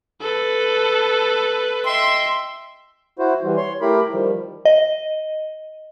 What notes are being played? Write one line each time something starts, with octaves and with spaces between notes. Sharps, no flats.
A4 B4
D#5 E5 G5 C6
E4 F#4 C5
E3 G3
C#5 C6
A3 E4 G4 A#4 B5
D#3 F3 G3
D#5